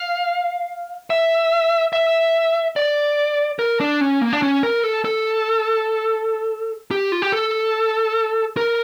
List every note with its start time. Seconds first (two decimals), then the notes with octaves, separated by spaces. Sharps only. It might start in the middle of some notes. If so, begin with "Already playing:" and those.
Already playing: F5
1.10 E5
1.93 E5
2.76 D5
3.59 A#4
3.80 D4
4.01 C#4
4.21 A#3
4.33 D4
4.42 C#4
4.63 A#4
4.84 A4
5.05 A4
6.91 G4
7.12 F4
7.22 G4
7.32 A4
8.57 A#4